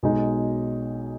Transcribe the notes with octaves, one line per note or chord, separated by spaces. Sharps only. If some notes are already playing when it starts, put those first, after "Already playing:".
B1 B2 G#3 D#4